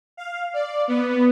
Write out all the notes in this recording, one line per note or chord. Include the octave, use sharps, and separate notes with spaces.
F5
D5
B3